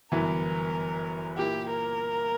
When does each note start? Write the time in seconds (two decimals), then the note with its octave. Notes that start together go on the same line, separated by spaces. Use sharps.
0.12 G1 F#2 E3 B3 E4 A#4
1.37 A#2 A#3 E4 G4
1.69 A#4